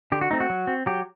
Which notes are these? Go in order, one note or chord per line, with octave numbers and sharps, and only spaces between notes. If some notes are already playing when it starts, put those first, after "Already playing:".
D3 G4
F#4
A3 C4 D#4
F#4
F#3
C4
F#3 G4